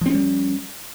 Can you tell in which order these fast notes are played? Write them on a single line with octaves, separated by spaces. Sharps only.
F3 C4 C#4 G3